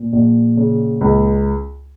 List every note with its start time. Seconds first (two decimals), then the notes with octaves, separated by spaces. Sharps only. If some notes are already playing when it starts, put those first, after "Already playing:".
Already playing: A#2
0.13 A#1
0.57 C#3
1.01 C#2